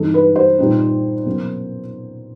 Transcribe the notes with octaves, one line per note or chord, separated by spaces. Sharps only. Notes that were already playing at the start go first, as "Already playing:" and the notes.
Already playing: G2 E3 G#3 C4 D#4 A4
B4
C5
A#2 G3 C4 D#4
B2 F#3 A#3 C#4